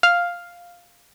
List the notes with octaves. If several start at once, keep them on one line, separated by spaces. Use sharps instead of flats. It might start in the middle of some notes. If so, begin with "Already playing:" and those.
F5